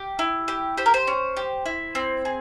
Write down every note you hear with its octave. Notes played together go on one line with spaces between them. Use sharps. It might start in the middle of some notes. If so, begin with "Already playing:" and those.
Already playing: G4
E4
G4
G4 C5
A#4
C5
C#4
G4
E4
C4
G#4